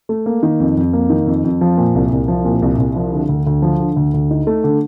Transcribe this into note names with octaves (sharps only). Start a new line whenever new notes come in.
A3
A#3
D#3
F2
F2
A#3
D#3
F2
F2
F3
A#2
C2
C2
F3
A#2
C2
C2
F3
D3
D2
D2
F3
D3
D2
D2
D#4
A3
D3